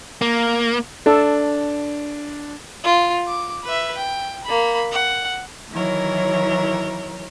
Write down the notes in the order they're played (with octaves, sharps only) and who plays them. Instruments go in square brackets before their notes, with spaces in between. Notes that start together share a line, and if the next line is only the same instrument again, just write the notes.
[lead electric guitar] A#3
[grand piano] D4 [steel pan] A4
[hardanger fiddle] F4
D6
B4 E5
G5
A#3 B5
F#5
[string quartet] D#3 E3 F#3 E4 A#4 C#5